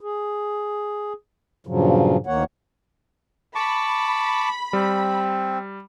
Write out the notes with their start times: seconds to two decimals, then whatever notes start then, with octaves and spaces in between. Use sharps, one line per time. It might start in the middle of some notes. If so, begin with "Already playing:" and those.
0.01 G#4
1.67 G2 A#2 C#3 F3 F#3
2.27 D2 D#3 A#3 C#5 F#5
3.55 A5 B5 C#6 D6
4.73 G3 C4